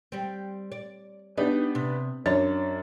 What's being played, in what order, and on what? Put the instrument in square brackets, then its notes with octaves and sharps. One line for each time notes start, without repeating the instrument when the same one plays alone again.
[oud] G3 C4
D5
[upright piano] B3 D4 G4 [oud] D#4
[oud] C3
[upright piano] F#2 D4 A6 [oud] C#5